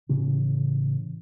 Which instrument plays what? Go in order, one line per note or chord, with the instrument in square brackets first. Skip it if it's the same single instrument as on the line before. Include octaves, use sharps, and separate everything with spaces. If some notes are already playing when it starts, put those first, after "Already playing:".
[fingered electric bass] A2 C#3 E3 C#4